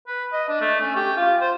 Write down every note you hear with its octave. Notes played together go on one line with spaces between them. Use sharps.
B4
D#5
D4
A3
C#4
G4
F4
C5